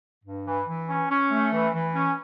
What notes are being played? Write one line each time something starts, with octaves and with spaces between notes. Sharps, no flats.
G2
E3
E3
C#4
C#4
A3
E3
E3
C#4